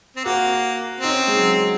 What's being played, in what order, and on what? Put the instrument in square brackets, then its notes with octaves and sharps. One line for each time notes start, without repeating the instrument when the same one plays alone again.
[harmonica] C4
[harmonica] A#3 [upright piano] F#4
[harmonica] C4 [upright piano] D#4
[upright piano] C#4
G#3
F#3